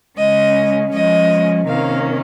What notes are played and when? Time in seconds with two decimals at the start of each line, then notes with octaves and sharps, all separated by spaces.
0.17 C#3 G#3 C#4 D#5
0.92 F3 G#3 C#4 D#5
1.66 C3 D#3 A#3 C#4 F5